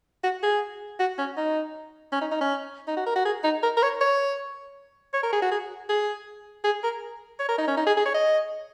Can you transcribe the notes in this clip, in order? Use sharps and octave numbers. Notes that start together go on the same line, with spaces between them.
F#4
G#4
F#4
C#4
D#4
C#4
D#4
D#4
C#4
D#4
F#4
A#4
F#4
G#4
D#4
A#4
A#4
C#5
C#5
C#5
A#4
G#4
F#4
G#4
G#4
G#4
A#4
C#5
A#4
D#4
C#4
D#4
G#4
G#4
C#5
D#5